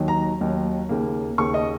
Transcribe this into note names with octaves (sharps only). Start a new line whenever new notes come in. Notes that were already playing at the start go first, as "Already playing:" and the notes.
Already playing: D#2 D#3 F#3
A#5
D#2 D#3 F#3
D#2 C#3 A#3
D#2 C#3 A#3 C#6
D#5